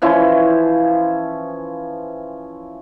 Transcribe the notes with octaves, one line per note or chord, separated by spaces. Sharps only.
E3 F3 C#4 E4